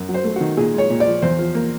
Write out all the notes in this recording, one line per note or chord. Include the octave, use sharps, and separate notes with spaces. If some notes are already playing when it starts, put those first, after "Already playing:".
Already playing: F#2
F#3
C5
A3
F#4
D#3
A#2 G#4
G#3 C#5
A#2
D5
F3
E2 C5
F3
A#3